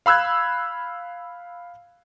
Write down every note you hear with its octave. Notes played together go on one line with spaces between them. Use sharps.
F5 B5 E6 F#6 G#6